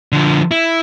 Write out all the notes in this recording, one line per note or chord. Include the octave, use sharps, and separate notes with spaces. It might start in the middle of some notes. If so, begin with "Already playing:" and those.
D3 F3
E4